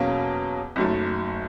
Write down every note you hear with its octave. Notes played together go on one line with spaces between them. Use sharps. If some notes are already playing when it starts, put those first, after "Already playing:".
Already playing: E2 B2 F#3 A#3 C#4
F#1 F#2 D#3 F#3 A3